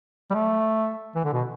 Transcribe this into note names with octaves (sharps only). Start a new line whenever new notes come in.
G3
A3
E3
D3
B2